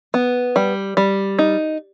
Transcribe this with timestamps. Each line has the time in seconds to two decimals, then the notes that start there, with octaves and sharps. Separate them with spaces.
0.14 B3
0.56 G3
0.97 G3
1.39 D#4